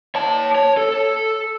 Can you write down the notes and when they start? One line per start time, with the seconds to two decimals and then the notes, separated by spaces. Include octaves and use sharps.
0.15 C#5 A5
0.55 C#5
0.77 A4